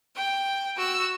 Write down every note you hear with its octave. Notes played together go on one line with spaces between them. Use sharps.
G5
F#4 E6